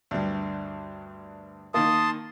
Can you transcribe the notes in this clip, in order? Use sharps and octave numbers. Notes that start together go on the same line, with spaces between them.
D2 G2
D#3 A#3 A5 C6 D#6